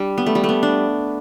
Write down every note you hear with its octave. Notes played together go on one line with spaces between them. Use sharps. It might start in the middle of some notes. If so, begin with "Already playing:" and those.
Already playing: G3 D4
B3
A3
G3
A3
B3
D4